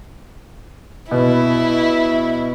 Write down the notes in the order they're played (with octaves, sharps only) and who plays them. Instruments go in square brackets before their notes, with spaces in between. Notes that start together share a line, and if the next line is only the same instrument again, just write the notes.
[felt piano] B2 [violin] E4